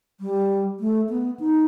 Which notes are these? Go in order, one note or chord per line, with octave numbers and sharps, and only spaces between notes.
G3
A3
B3
D#4